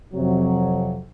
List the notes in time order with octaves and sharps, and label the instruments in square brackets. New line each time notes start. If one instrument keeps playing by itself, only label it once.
[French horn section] F2 C3 F#3